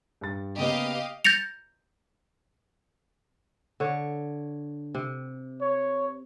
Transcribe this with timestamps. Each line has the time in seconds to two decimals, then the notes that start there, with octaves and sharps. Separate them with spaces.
0.21 G2 A6
0.58 C#3 A#3 B3 G4 D#5 F5
1.25 G6 A6 A#6 C#7 F7
3.80 D3 C#5
4.95 C3
5.61 C#5